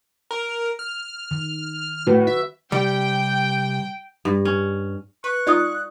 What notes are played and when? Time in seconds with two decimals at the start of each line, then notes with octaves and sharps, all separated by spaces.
0.31 A#4
0.79 F6
1.31 D#3
2.07 A2 F#4 B4
2.27 E5
2.72 C3 G3 G5
4.25 G2
4.45 C#4
5.24 B4 C#6 F#6
5.47 D#4 F4 D5 D#6